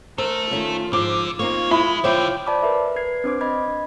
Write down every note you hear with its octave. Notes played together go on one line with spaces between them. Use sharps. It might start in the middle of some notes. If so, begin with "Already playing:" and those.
A4 A#4 C5 E5
D#3 A3 C#4 F4
G#2 D3 F3 D6
G2 A#3 C4 D#4 F4 C#5
G#3 E4 B5
B1 D3 F4 C5 C#5 E5 G5
C5 D5 A5 B5 D6
A#4 B4 E5
B4 G#6 C7
C4 D4 C5 D6
D#5 B5 G#6